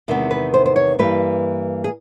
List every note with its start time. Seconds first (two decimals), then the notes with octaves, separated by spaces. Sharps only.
0.08 E2 C3 D#3 G#3 B3
0.31 B4
0.54 C5
0.66 C5
0.76 C#5
0.99 G2 E3 G3 A#3 B4
1.84 G#4